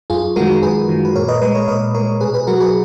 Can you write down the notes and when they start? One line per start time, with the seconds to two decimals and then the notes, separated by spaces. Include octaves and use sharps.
0.10 F#2 F4 G#4
0.36 D#3 G#3 F#4 A#4
0.63 F#2 G#4 B4
0.89 D#3 G#3
1.05 B4
1.15 A#2 A#4 C#5
1.28 B4 D#5
1.41 G#3 B4 D#5
1.55 A#4 C#5
1.68 A#2 B4 D#5
1.95 G#3 A#4 C#5
2.20 B2 G#4 B4
2.33 G#4 B4
2.47 F#3 F#4 A#4
2.60 G#4 B4